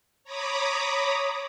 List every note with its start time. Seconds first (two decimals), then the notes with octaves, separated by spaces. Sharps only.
0.24 C#5 A#5 B5 D6 D#6